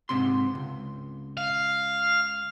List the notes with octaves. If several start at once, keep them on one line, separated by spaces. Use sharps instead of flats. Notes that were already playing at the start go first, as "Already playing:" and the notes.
G#2 C3 C6
C#2
F5